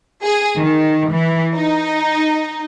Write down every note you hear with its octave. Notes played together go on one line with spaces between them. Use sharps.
G#4
D#3
E3
D#4